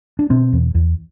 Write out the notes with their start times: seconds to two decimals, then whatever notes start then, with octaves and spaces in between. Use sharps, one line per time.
0.19 D4
0.30 B2 C4
0.53 E2
0.75 E2